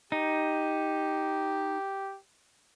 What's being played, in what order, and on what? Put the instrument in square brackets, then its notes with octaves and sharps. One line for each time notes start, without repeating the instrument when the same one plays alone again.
[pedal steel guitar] D#4 [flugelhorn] G4